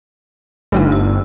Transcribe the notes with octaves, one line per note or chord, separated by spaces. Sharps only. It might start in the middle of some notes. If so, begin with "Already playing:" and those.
G1 A3 D4 D#4
E6